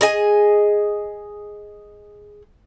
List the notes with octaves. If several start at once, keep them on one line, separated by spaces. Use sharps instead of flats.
G#4 D#5 G#5